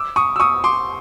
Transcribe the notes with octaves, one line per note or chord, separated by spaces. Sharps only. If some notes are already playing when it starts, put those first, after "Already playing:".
Already playing: D6 E6
C#6 D#6
E6
C#6 D#6
C6 D6